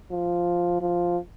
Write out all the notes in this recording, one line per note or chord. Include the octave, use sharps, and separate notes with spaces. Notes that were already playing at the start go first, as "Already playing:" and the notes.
F3
F3